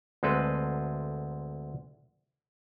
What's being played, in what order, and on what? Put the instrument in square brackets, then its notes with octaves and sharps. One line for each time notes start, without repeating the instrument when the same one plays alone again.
[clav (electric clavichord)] D2 G#3 C4 A4 B4